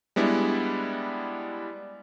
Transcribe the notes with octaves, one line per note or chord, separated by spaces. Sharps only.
G3 G#3 B3 D4 E4